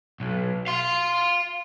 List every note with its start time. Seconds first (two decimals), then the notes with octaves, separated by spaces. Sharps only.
0.20 B1
0.67 F5 C6